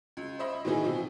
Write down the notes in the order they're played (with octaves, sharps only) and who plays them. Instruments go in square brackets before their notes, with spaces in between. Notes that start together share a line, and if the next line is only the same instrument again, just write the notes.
[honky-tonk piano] C#2
C5 D#5 E5 B5
A2 D#3 E3 B3 D#4 G#4
C3 F3